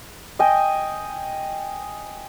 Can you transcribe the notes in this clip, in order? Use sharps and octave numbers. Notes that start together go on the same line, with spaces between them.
D#5 G5 G#5